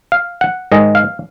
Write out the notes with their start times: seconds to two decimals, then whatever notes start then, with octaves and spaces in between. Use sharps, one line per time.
0.12 F5
0.41 F#5
0.72 G#2 D#3 G#3 D#5
0.95 F5